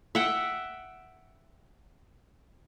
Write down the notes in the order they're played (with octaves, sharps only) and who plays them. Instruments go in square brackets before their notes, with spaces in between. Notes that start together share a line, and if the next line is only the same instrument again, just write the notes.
[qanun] E5 F#5 G5